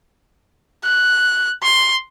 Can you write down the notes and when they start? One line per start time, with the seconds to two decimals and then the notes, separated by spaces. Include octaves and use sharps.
0.85 F#6
1.63 C6